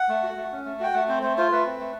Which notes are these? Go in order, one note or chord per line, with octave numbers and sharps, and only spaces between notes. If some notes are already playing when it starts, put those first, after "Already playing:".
Already playing: F#5
A3
F#4
A3
C#4
A3
F#4 G5
A3 F#5
C4 C5
A3 C5
F4 C5
A3 B4
C4
A3